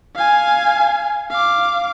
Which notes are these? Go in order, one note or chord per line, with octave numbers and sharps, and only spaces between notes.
F5 G#5
F5 D6